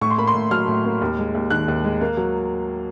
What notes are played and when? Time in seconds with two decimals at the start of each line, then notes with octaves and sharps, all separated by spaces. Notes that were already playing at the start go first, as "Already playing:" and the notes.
0.01 A2 C#6
0.10 C6
0.18 A#3 B5
0.27 C6
0.35 A2
0.51 F#3 F6
0.68 A2
0.85 A#3
1.02 D#2
1.18 G#3
1.35 D#2
1.50 D#3 F#6
1.68 D#2
1.84 G#3
2.01 A#3
2.17 F#3